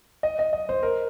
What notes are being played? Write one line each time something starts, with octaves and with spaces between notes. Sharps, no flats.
D#5
D#5
D#5
C5
A#4